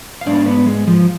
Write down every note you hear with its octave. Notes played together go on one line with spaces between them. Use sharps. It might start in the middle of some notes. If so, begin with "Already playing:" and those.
F5
G#2 G#3 B3 D4 D5
B3 B4
G#3 G#4
F3 F4